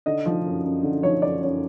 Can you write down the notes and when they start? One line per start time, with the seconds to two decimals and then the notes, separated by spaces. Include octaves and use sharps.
0.06 D3 D#5
0.26 F3
0.45 F#2
0.64 F#2
0.83 D3
1.03 F3 C#5
1.22 F#2 D5
1.42 F#2 C#5